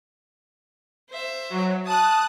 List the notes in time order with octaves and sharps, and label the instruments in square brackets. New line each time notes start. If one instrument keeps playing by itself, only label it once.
[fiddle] C5 E5
[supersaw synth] F#3
[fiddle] A5 [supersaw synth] D#6 F#6